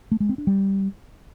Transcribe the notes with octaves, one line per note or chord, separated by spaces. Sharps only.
A3
G#3
C4
D4
G3